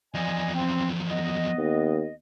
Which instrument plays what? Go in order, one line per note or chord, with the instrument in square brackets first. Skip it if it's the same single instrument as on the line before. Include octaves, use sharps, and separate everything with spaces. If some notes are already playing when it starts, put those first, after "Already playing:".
[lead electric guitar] E2 F3 [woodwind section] D5 D#5 G#5
[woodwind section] C4
B3 D#5
[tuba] D#2